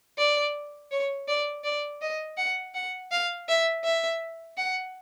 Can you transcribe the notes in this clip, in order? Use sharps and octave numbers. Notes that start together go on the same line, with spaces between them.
D5
C#5
D5
D5
D#5
F#5
F#5
F5
E5
E5
F#5